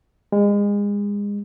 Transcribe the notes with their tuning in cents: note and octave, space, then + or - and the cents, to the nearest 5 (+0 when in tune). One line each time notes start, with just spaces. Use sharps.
G#3 -30